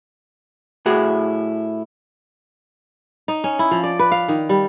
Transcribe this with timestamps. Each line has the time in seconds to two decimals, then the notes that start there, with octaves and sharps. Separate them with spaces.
0.86 A2 E4 F#4 G#4
3.28 D#4
3.44 C#4
3.59 E4
3.71 F3
3.84 D5
3.99 B4
4.12 F5
4.28 D#3
4.49 G3